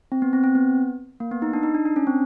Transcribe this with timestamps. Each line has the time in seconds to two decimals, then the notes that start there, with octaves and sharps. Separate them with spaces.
0.12 C4
0.22 B3
0.33 C4
0.44 C4
0.55 B3
1.20 A#3
1.31 B3
1.42 D#4
1.53 D4
1.63 D#4
1.74 D4
1.85 D4
1.96 C#4
2.07 C4